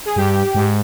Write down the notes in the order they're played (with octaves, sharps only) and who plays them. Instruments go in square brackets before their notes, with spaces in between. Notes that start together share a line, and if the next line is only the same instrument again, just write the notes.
[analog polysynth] G#4
[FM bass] G2 [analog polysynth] G4
[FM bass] G#2